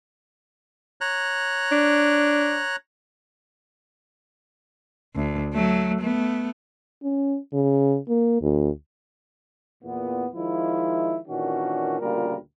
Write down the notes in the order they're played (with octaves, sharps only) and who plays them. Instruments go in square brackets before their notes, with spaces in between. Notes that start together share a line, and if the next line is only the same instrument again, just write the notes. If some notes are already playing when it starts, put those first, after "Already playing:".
[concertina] C#5 A#5 F#6
[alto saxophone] D4
[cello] D2
F#3 A3
A3 B3
[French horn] C#4
C#3
A#3
D2
[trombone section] E2 A#2 B3
D#3 F3 G#3 E4
A#2 D#3 E3 C#4 D4 F#4
D2 A#2 C#3 G3 F4 A#4